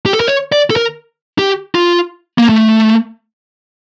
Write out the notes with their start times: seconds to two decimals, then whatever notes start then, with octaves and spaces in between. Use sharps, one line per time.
0.06 G4
0.13 A4
0.20 A#4
0.27 C#5
0.52 D5
0.70 A4
0.76 A#4
1.39 G4
1.75 F4
2.38 A#3
2.49 A3